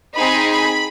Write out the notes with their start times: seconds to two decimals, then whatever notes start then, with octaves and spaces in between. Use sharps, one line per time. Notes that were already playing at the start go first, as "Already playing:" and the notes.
0.15 C4 D#4 G#4 B5
0.49 B5